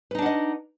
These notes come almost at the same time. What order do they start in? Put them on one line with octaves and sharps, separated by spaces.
B4 D#4 D4 F#5 D#5